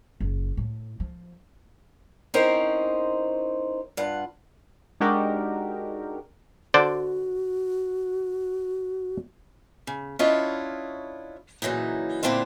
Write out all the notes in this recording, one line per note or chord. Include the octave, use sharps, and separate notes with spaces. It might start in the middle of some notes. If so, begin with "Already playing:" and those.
F#1
A2
F3
C4 C#4 D#4 E4 A#4 C5
G2 F4 F#5
G#3 D4 D#4 F#4 G4 A#4
D3 F#4 C5 D5
C#3
C#4 D4 E4 F4 C#5 D#5
A#2 C#3 E3 F#3 D#4
A#2 D3 C4 D4 E4 F4